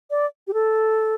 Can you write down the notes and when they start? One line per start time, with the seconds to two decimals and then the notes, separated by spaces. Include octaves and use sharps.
0.11 D5
0.48 G4
0.54 A4